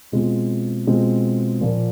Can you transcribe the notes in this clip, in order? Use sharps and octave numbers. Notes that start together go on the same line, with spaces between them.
B2 G#3 C4 F4
B2 G#3 C4 F4
A#2 F3 A#3